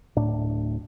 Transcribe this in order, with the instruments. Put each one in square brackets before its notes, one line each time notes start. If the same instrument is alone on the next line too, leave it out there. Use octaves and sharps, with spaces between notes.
[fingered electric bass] D1 A2 D4